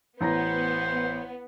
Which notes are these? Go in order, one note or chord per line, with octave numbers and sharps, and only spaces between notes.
A1 B3 C5 A#5 A#6